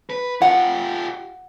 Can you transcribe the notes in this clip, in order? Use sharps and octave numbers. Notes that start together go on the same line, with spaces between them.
B4
F4 G4 F#5